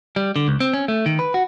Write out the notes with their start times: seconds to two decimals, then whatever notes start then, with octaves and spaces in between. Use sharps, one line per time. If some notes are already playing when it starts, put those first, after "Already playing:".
0.16 G3
0.36 D3
0.48 C#2
0.60 C4
0.74 C#4
0.88 A3
1.06 D#3
1.19 B4
1.34 F#4